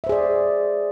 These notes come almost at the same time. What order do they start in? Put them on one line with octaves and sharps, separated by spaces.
E5 C5 G#4 D5